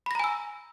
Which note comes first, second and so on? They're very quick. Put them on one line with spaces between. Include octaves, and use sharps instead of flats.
B5 A#6 A#5 G#5 E6